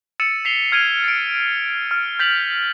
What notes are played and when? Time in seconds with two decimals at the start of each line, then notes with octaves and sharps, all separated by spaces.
0.20 E6 A6 C#7 D#7 E7
0.45 B6 C7 F7 G7
0.72 F6 G#6 D7 D#7 F7 G7
1.04 A6 D7
1.91 F6
2.19 G6 A6 B6 F7 F#7